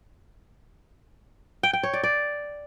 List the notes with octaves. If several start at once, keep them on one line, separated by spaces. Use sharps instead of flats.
G5
G5
C#5
D5
D5